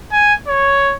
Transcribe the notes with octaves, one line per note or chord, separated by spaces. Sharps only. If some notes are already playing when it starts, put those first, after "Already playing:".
G#5
C#5